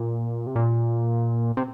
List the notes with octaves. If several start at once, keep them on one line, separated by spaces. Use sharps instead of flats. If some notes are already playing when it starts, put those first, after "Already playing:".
Already playing: A#2
C3
A#2
C3